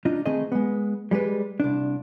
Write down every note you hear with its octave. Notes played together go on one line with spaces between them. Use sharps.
D4 D#4 F4
D#3 A3 C4 D#4 G#4 D#5
G#3 B3
G3 G#3 G4 B4
C2 D4